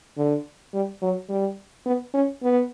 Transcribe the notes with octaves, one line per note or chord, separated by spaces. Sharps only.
D3
G3
F#3
G3
B3
C#4
B3